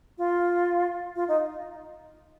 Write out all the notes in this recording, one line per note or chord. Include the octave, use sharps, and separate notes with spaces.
F4
F4
D#4